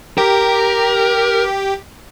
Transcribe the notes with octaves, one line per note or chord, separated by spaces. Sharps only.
G4 A#4